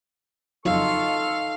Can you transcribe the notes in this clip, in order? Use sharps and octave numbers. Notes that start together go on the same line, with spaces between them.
F2 C#3 F#3 D#4 F4 A4 F5 C#6